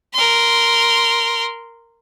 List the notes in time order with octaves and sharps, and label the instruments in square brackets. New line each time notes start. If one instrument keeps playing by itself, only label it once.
[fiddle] A#4 C6